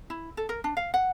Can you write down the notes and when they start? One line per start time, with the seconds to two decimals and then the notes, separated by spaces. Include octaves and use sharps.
0.10 E4
0.37 A4
0.49 A#4
0.64 D4
0.77 F5
0.94 F#5